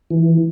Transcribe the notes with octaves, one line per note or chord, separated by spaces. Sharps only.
E3